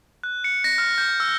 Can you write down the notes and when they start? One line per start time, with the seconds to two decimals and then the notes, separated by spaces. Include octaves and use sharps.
0.23 F#6
0.44 C#7
0.64 A#6
0.78 F6
0.98 G6
1.20 E6